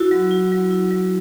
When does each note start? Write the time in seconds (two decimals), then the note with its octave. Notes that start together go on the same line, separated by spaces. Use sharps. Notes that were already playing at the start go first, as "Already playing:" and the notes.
Already playing: E4 F#4
0.11 F#3
0.31 E4
0.52 F#3
0.71 E4
0.91 F#3